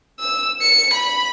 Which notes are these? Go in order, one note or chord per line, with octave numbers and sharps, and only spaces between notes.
E6
C#7
B5